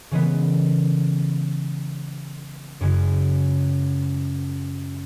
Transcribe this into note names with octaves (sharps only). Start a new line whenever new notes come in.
C#3 E3 G#3 B3
F#2 C#3 G#3